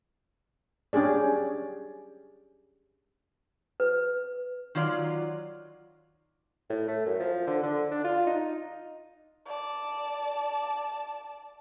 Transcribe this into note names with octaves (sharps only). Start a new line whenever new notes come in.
C#4 D4 G4 G#4 D5
B4
D#3 F#3 F4 D5
A2
A3
F#2
F3
D3
D3
D4
F4
D#4
D5 A5